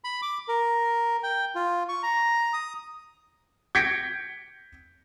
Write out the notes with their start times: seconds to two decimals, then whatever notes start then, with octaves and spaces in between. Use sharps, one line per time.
0.04 B5
0.22 D6
0.48 A#4
1.23 G5
1.55 F4
1.89 C#6
2.03 A#5
2.53 D#6
3.75 G6 G#6 A#6 B6 C#7 D7